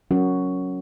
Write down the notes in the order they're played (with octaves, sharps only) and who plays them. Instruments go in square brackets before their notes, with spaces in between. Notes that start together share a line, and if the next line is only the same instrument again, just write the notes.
[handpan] F#3 C#4 F#4 A#4